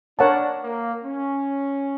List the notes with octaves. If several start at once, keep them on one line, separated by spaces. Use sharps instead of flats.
D4 A#4 C#5 F#5 A5
A#3
C#4